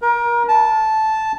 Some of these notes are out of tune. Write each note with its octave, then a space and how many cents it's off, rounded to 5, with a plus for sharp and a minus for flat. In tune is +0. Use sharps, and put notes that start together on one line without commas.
A#4 +30
A5 -10